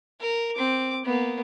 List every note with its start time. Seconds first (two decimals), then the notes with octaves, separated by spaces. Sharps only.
0.21 A#4
0.56 C4 D6
1.05 A#3 B3